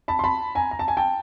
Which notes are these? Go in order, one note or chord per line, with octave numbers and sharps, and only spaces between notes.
A5 B5
C6
A5 B5
G#5 A#5
A#5
A5
G#5
G5 A5